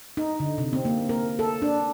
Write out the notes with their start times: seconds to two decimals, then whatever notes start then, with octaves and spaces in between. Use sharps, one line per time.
0.17 D#4
0.40 D3
0.58 C3
0.73 C4
0.85 A#3
1.09 A#4
1.39 A4
1.62 D4